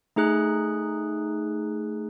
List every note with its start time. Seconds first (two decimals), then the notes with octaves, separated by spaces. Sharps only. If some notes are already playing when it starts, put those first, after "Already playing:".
0.16 A3 D#4 G#4 F#6